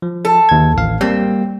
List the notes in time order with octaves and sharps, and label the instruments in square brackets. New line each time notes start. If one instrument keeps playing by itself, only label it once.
[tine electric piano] F3
[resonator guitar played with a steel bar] A4
[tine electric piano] D#2 G#6
A1 F5
[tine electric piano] G3 A#3 [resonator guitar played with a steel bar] C4